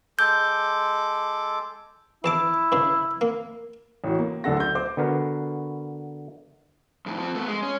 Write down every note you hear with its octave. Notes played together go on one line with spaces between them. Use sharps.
G#3 A4 D6 G6
E2 E4 A5 D6
G2 C#3
A#3
A1 F#4
A#3
D1 D2 D4 A4 F#5 A#6
G6
C5 D6
D3 B3 F#4 A#4 B4
F2 A2
F3 C4
A3 B3
G#3
C#4